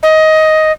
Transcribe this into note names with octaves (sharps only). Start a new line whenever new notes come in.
D#5